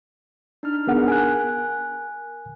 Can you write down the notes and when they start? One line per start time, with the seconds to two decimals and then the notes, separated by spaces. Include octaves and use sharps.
0.63 D4 D#4 F6
0.87 B3 D4 G#4 A#4 F#5
1.08 A#4 G#5 F#6 D7